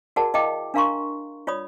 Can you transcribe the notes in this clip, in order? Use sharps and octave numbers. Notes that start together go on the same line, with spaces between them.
F#4 G#4 A#4 D5 F#5 A5
E4 D#5 F5 G5 D6
D4 A#4 F5 A#5 C6 C#6
F4 C#5 D5 B5 D#6